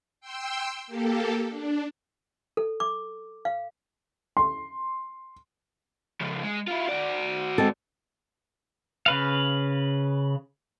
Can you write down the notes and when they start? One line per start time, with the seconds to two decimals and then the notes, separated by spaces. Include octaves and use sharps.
0.20 G5 C6 E6
0.87 A#3 G4 A4
1.48 D4
2.57 A4
2.80 D6
3.45 F5
4.37 C6
6.21 C#3 F3
6.44 G#3
6.68 E4 F4
6.89 F#4 D5
7.58 G#3 C4 A4
9.06 C#3 B4 F5